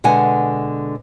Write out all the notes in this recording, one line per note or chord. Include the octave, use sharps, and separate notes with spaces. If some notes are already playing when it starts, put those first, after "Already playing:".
B2 D3 G#3 F#5 G#5